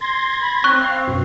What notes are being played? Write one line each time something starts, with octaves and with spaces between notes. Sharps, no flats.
C6 G#6 A#6
B5
C4 C#6 F#6
F5
F#2 B2